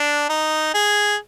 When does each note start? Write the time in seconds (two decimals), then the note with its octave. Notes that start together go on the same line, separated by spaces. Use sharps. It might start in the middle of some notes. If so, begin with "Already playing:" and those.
Already playing: D4
0.29 D#4
0.74 G#4